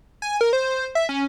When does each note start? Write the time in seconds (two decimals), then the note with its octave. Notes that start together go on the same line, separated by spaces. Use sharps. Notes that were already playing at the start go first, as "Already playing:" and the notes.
0.22 G#5
0.41 A#4
0.53 C5
0.95 E5
1.09 C#4